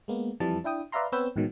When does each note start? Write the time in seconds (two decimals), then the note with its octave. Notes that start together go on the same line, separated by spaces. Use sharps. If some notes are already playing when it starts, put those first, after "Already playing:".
0.08 G#3 A#3 B3
0.40 F2 E3 G3 A5
0.64 D4 E4 G5 D#6
0.92 B4 D5 E5 F5 A#5 C6
1.12 B3 C4 B4 C#5 E6 G6
1.36 A1 G#2 B2 D#3 F#3